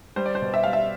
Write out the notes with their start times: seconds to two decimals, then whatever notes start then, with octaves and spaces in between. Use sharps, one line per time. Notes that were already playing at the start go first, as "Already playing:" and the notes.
0.16 G3 C5
0.26 D5
0.35 C5
0.41 B2
0.54 E5
0.64 G3 F5
0.73 E5